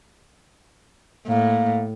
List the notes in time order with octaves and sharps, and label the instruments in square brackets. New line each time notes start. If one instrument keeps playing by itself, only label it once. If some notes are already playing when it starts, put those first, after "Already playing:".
[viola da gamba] A2 [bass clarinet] A#3